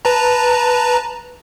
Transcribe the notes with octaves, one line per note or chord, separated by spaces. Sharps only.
B4 A5 A#5